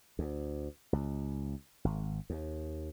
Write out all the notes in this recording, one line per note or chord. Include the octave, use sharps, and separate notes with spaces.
D2
C#2
G#1
D#2